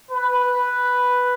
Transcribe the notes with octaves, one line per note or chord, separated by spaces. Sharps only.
B4